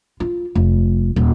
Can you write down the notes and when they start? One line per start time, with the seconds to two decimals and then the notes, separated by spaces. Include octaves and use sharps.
0.20 F4
0.55 F1
1.16 D#1